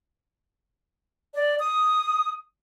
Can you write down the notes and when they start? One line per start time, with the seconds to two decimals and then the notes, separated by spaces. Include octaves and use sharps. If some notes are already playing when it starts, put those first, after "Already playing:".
1.34 D5
1.59 D#6